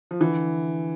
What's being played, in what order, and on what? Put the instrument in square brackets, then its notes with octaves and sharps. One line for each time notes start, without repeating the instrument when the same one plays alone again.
[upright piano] F3
D3 E3